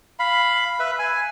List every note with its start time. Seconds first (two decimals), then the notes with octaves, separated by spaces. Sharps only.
0.19 F5 B5
0.79 B4 E5
0.99 G#5